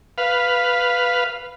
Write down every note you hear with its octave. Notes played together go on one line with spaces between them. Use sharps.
B4 F5